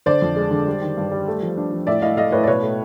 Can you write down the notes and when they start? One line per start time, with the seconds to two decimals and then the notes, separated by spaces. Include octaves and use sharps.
0.06 D3 C5 D5
0.22 F2
0.36 G#3
0.51 D3
0.67 G3
0.81 D#3
0.97 G2
1.11 G3
1.27 A3
1.43 F3
1.57 D4
1.72 F3
1.87 A2 D5 E5
2.02 A2 D#5 F5
2.17 A3 D#5 F5
2.32 A2 B4 C#5
2.44 D5
2.47 B2 B4 C#5
2.62 A3